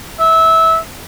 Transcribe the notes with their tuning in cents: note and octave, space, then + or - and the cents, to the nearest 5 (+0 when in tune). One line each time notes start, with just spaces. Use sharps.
E5 -20